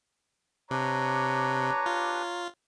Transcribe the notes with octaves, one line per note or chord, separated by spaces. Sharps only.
C3 D4 G4 B4 C#5 A#5
F4